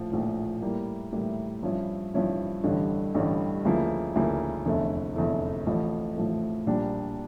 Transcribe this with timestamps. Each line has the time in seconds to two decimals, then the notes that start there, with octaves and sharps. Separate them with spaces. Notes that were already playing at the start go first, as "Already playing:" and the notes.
Already playing: A#1 A2 F3
0.12 A#1 A2 F3
0.62 A2 G3 A#3 E4
1.12 A2 G3 A#3 E4
1.63 G2 F3 C#4 E4
2.14 G2 F3 C#4 E4
2.63 A1 G2 D3 G3 C#4
3.14 A1 G2 D3 G3 C#4
3.65 D2 C#3 F3 A#3 E4
4.15 D2 C#3 F3 A#3 E4
4.66 F1 E2 D3 A3 E4
5.16 F1 E2 D3 A3 E4
5.66 A1 A2 F3 A3
6.16 A1 A2 F3 A3
6.66 A#1 A#2 G3 A#3 D4